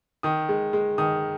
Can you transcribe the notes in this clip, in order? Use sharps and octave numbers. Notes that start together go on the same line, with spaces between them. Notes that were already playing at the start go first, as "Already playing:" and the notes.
D#3 D#6
G#3
G#3
D#3 D#6